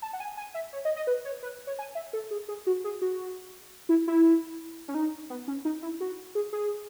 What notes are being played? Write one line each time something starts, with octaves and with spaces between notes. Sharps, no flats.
A5
F#5
G#5
G#5
E5
C#5
D#5
D#5
B4
C#5
B4
C#5
G#5
E5
A4
G#4
G#4
F#4
G#4
F#4
E4
E4
C#4
D#4
B3
C#4
D#4
E4
F#4
G#4
G#4